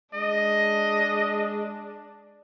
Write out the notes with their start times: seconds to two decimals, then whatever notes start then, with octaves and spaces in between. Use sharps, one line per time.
0.14 G#3 D4 D#5